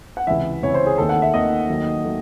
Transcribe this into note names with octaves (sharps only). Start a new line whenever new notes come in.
F#5
C#2 C3 E3 E5
C#2 C3 E3 C#5
C5
G#4
D#2 D#3 A3 A4
F#5
E5
D#2 D#3 A3 D#5
D#2 D#3 F#3 A3
D#3 F#3 A3